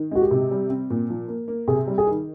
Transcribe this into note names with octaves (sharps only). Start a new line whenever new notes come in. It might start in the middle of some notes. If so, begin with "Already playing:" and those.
Already playing: D#3
G#3 F#4
G4
C3
G3
C4
A#2
F3
A#3
A#3
C3 G#4
G3
G#4
D#3